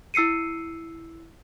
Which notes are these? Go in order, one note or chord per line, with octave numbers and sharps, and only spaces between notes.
E4 E6 C7 C#7 D#7